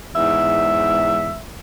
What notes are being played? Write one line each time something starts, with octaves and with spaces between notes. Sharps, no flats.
E2 G#2 E5